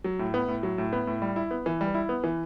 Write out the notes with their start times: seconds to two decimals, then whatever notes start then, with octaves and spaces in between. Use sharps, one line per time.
0.04 F#3
0.19 A2
0.34 B3
0.48 A2
0.63 F#3
0.78 A2
0.93 B3
1.07 A2
1.22 G3
1.36 E4
1.51 B3
1.66 E3
1.81 G3
1.94 E4
2.09 B3
2.24 E3